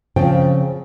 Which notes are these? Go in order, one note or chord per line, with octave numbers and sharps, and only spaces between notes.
C#3 F3 C4 F4 C5 G5